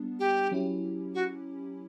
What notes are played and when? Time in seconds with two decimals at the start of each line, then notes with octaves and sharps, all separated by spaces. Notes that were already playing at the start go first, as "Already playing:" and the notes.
Already playing: G3 B3 D4
0.19 G4
0.51 F#3 C#4 E4 G4
1.14 F#4